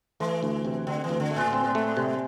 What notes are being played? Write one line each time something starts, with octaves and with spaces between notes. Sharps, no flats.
E3 A3
D2
C3
D3 C4
E3
D2
D3
A3
A2
C4
A3
C3